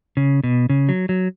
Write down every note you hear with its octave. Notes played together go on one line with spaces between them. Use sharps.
C#3
B2
C#3
F#3
F#3